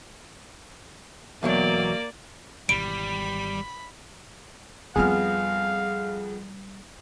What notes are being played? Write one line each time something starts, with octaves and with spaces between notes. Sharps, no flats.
E2 B2 F#3 A#3 D5
G#1 B2 E3 G3 B5 D7
F2 G3 B3 C4 G#4 F5 F6